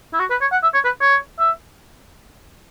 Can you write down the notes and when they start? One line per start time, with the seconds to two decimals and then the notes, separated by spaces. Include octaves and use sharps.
0.13 E4
0.19 F#4
0.30 B4
0.41 C#5
0.52 F#5
0.63 E5
0.74 C#5
0.85 B4
1.01 C#5
1.39 E5